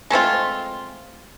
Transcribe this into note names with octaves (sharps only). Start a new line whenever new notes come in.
G#3 A3 C4 F4